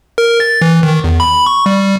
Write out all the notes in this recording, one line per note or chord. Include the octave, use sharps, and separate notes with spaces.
A#4
A6
E3
D#3
E2
B5
C#6
G3